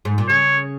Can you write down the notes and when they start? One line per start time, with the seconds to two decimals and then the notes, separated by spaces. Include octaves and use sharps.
0.05 G#2
0.18 A#2
0.28 C#3 C#5